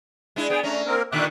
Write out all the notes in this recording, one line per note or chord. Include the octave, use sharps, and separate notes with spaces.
G#3 D4 E4
B3 G#4 G5
A3 C#4 D4 A#5
A#3 C4 A#4
A#2 D3 D#3 E5 D6 F#6